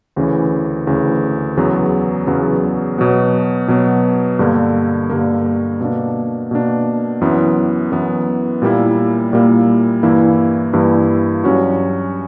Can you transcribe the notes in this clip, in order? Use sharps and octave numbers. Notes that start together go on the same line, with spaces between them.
D2 C#3 E3
D2 C#3 E3
E2 C#3 F#3 B3
E2 C#3 F#3 B3
B2 F#3 B3
B2 F#3 B3
G2 D3 A#3
G2 D3 A#3
B2 A#3 D4
B2 A#3 D4
F#2 E3 B3 E4
F#2 E3 B3 E4
A#2 G3 A#3 E4
A#2 G3 A#3 E4
G2 E3 A#3 E4
G2 E3 A#3 E4
G2 F#3 C#4 F#4